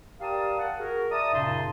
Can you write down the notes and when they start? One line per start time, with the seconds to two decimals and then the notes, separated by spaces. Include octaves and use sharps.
0.20 G4 A#4 D5 F5 A5 D#6
0.59 F#5
0.78 F#4 G#4 A#4
1.11 D5 E5 A5 A#5 D#6
1.33 F#2 A#2 C#3 D#4 A5 C6